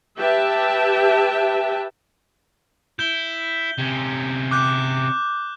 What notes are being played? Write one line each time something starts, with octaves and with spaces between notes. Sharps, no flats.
G4 B4 E5 G5 A5
E4 G6 G7
C3 C#4
D6 F#6 G6